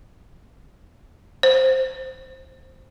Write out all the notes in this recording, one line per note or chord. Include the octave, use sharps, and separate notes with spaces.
C5